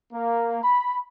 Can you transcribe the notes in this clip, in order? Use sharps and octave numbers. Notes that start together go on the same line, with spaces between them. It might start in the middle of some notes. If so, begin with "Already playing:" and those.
A#3
B5